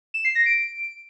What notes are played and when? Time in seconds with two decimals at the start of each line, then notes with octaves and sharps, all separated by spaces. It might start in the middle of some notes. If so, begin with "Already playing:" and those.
0.14 E7
0.25 C7
0.35 A#6
0.46 D7